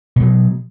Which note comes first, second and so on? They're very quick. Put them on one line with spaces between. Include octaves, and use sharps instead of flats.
B2 G#3 F#3